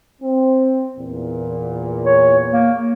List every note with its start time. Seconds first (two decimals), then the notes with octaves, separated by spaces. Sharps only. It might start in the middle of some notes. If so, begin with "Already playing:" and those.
0.22 C4
0.97 E2 A#2
2.05 C#5
2.50 A#3